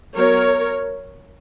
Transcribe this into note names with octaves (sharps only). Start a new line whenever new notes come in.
F#3 B3 A#4 C#5